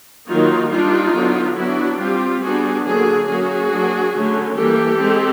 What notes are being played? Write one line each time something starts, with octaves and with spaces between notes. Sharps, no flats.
D#3 F#3 A#3 D#4 F4
G3 A#3 D4 D#4 F4
D3 F#3 B3 D4
F#3 B3 D4 E4 F#4
G3 C4 F4 G4
G3 B3 D4 F#4 G#4
D3 F#3 A#3 D4 F#4 G#4
F#3 A#3 C#4 F#4 G#4
F#3 A#3 D4
D3 F#3 A3 C#4
E3 G3 A#3 G4 A4
G#3 C4